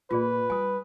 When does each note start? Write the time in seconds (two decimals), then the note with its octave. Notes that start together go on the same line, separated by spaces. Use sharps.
0.10 A#2 F4 G#4 B4 D5
0.50 G3 G#5 D#6